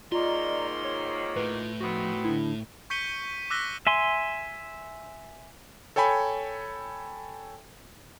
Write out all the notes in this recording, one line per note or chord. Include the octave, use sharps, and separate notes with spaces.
G#2 D#3 A#3 F4 D5 D#5 A#5 C6
F4 C#5
A2 B4
D#3 F3 B3 C4 F#4
D3 D4 E4
C#6 G6 B6 C#7 D#7 G7
D6 E6 F#6 A#6 B6 G7
E5 G#5 C6
A4 C#5 G5 G#5 B5